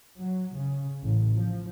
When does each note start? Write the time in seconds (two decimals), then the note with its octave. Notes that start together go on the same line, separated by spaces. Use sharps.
0.19 F#3
0.57 C#3
1.03 A1
1.36 F3